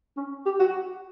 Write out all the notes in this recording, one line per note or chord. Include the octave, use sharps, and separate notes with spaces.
C#4
G4
F#4